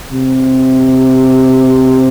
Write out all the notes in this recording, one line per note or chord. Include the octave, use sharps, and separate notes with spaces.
C3